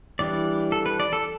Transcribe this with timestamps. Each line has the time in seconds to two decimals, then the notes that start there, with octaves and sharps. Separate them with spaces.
0.19 E3 G3 D4 D5
0.72 A4
0.86 B4
1.00 D5
1.13 A4